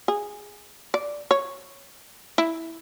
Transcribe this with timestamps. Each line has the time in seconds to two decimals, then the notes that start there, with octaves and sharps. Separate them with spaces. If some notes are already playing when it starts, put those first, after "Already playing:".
0.08 G#4
0.94 D5
1.31 C#5
2.38 E4